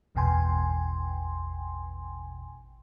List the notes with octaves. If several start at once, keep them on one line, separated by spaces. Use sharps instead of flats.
A1 E2 B2 G5 G#5 C6